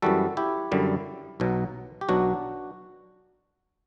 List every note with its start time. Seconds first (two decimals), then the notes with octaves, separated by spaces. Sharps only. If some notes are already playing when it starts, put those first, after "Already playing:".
0.02 F#2 E3 G3 F#4 A4
0.37 E4 G4
0.72 F#2 D3 G3
1.40 B1 B2 F#3
2.01 G4
2.09 B1 B2 F#3 D4 F#4